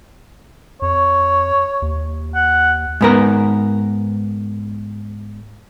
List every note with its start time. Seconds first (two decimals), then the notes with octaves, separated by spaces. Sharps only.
0.82 F2 C#5
1.82 D#2
2.35 F#5
3.01 G#2 B3 A#4